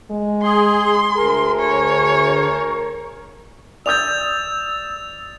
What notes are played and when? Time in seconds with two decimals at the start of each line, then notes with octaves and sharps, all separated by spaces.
0.11 G#3
0.43 G#4 C6
1.17 D2 G#4 A#4
1.59 C#5
3.86 D5 D#6 E6 G6 A6 F7